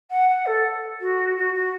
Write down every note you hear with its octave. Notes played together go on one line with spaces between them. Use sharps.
F#5
F#5
A4
F#4
F#4
F#4